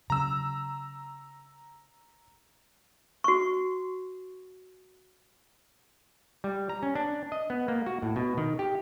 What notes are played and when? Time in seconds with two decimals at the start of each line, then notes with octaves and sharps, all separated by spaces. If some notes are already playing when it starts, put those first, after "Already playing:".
0.10 C#3 F#3 A#5 E6
3.24 F#4 C#6
6.44 G3
6.69 A#5
6.83 C#4
6.95 D4
7.32 D#5
7.50 B3
7.68 A#3
7.86 F#4
8.02 A2
8.16 B2
8.37 D#3
8.59 G4